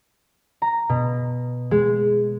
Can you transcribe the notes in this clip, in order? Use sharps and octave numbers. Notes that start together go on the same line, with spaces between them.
A#5
B2
G#3